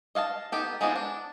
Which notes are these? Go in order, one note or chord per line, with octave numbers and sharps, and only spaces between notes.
D#5 F5 F#5 A5
B3 D#4 G4 A4
G#3 B3 C4 D#4 F4
D4